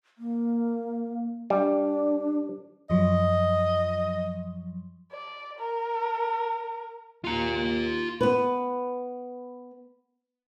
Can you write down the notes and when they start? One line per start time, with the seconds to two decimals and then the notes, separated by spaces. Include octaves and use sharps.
0.18 A#3
1.50 G3 D4
2.90 F#2 F3 F#3 D#5
5.11 D5
5.58 A#4
7.24 D#2 F4 A#5
8.21 B3 B4